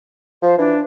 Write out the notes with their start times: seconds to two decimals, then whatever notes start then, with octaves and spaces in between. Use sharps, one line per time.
0.43 F3 C5
0.58 E3 D4